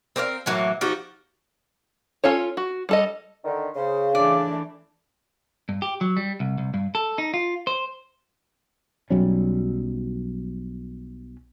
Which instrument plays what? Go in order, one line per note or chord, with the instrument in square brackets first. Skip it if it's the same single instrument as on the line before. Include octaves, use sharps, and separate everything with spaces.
[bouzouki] C4 A#4 D5 F5
A2 E3 F#3 A#3
F3 D#4 F#4 G4
[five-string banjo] C#4 F4 A4 C#5
F#4
G3 A4 D#5
[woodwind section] D3 D#3
[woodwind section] C#3 [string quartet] C5
[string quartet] E3 A3 D4 [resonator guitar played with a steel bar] D5
[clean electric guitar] G2
G4
F#3
G3
C2
C2
G2
A4
D#4
F4
C5
[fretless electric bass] B1 F#3 G3 C#4